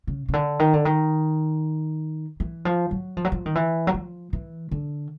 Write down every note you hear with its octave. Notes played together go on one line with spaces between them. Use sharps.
C#3
C#3
D3
D#3
D3
D#3
E3
F3
F#3
F3
F#3
F3
D#3
E3
F#3
F3
E3
D3